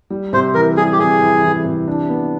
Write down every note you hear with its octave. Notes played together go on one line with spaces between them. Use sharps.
G3
C3 C5
E3 A#4
G3 G#4
G4
C3 G#4
E3
E3
C3
D4
B3